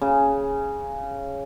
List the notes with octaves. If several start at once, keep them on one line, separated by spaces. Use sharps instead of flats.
C#3